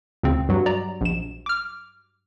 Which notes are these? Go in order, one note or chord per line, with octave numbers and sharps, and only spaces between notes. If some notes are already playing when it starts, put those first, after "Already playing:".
D2 C#3 C4
G2 F#3
D5 A#5
A#1 E7
D6 F6